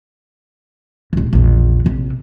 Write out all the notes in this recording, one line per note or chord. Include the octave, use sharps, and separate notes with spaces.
D#1 C2
A#1 E2
A#1 C3